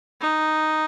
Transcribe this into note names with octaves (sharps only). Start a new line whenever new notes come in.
D#4